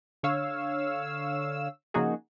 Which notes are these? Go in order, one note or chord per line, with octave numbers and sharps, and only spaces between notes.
D3 C#5 F5 E6
C#3 F3 A#3 D#4 F#4 G#4